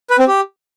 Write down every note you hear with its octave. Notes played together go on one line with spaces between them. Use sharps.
B4
C4
G4